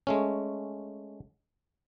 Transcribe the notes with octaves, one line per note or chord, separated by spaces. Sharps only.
G#3 A3 C#4